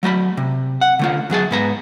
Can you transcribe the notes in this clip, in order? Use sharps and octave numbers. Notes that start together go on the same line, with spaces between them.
F#3 A3 A#5 B5
C3
F#5
D3 A3 F4
E2 F#3 G#4 A5
G#2 B3 A#5